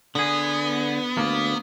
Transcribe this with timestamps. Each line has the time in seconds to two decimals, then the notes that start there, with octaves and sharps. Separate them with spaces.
0.15 D3 B3 G#4
1.17 D2 A#3